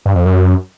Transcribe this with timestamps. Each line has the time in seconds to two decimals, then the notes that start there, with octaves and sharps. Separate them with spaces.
0.06 G2
0.15 F2
0.25 F#2